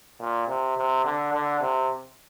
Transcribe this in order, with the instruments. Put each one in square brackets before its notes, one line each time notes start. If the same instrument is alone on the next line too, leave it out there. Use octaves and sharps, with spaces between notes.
[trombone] A#2
C3
C3
D3
D3
C3